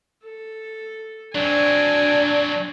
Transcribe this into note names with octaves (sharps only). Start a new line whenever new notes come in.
A4
F#3 C4 D4 G#5